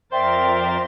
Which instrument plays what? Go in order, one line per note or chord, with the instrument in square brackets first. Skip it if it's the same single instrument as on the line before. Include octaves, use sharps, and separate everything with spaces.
[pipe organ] F2 A#4 A6 [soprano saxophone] C5 [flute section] D5 E5 G5 [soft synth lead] C6